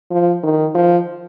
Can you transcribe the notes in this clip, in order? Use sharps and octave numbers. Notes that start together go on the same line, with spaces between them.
F3
D#3
F3